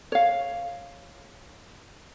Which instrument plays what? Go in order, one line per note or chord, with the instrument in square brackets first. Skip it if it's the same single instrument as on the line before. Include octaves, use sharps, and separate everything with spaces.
[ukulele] C#5 F5